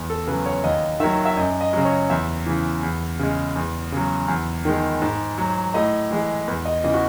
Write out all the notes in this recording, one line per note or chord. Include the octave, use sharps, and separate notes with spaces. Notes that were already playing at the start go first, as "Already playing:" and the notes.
Already playing: E2
A4
C#3 F#3 B4
C#5
D#2 D#5
D#3 F#3 E5
E5
F#2 D#5
D#5
C#3 F#3
C#5
E2 E5
C#3 E3
E2
C#3 G#3
E2
C#3 F#3
E2
D#3 G#3
G#2
F#3
A2 D#5
E3 G#3
E2 B4
D#5
C#3 E3 D#5
F#4